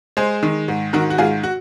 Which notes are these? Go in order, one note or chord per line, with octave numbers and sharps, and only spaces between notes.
G#3 G#4 C5
D#3
G#2
D#3 F#4 A#4
F#4
G#2 F4 G#4
F#4